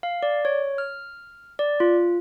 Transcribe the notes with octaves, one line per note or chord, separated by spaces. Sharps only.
F5
D5
C#5
F6
D5
F4